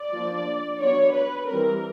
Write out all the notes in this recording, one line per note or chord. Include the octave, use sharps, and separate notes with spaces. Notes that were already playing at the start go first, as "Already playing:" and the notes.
Already playing: D5
F3 A#3 D4
F#3 B3 D4 C#5
B4
E3 G3 C4 A#4